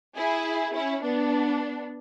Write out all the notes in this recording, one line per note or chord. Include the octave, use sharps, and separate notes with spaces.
E4 G#4
C#4 E4
B3 D4